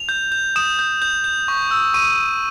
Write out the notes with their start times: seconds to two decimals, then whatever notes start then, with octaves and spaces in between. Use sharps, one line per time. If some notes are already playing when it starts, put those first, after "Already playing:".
Already playing: F7
0.09 G6
0.32 G6
0.56 D#6 E7
0.79 G6
1.02 G6
1.24 G6
1.48 C#6
1.71 E6
1.94 C#6 D#7